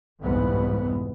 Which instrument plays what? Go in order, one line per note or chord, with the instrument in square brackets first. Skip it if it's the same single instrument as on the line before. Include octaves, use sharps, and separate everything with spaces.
[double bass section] G1 C2 F2 G#2 E3 B3